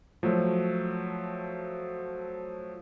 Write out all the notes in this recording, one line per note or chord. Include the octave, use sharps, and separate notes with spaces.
F3 F#3 A3